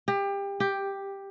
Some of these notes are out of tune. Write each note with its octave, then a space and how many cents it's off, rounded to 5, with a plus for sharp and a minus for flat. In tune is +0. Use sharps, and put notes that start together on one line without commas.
G4 +25
G4 +5